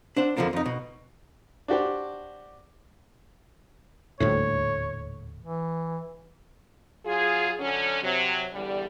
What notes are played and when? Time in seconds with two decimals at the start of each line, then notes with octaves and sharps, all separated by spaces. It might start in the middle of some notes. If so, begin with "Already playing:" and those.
0.16 D4 C5 F#5
0.37 F2 D3 E3 F3 A#3 D4
0.53 F2 D#4
0.66 B2
1.68 D4 F#4 G4 C5
4.20 D#1 D2 A2 C#5
5.41 E3
7.06 F#3 F4 G#4
7.59 D3 F#3 C#4
8.02 C3 F#3
8.53 E2 D3 G3